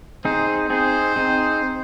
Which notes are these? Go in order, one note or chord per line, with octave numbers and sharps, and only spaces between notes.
C4 D#4 G#4 C5
C4 D#4 G#4 C5
C4 D#4 G#4